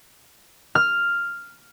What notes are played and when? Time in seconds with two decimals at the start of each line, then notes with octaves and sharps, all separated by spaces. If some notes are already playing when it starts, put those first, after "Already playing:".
0.75 F6